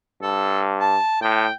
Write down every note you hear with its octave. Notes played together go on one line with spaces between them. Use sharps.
G2 A4
A5
A2 G5